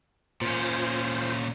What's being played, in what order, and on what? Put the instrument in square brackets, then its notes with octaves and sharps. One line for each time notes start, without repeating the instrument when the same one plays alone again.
[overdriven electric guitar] A#2 C#4 [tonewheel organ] F4 C5